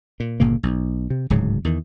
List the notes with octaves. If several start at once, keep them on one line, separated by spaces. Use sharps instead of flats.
A#2
G1 A#2 C#3 A#3
B1
C3
D1 G#2 C#3 F#3
E2 D#3